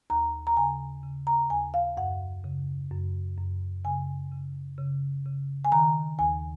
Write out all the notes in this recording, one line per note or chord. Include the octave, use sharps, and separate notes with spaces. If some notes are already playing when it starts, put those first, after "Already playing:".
D#2 A#5
A#5
C#3 G#5
C#3
A#5
D#2 G#5
F5
F#2 F#5
C#3
F#2
F#2
C#3 G#5
C#3
C#3
C#3
G#5
D#3 A#5
D#2 G#5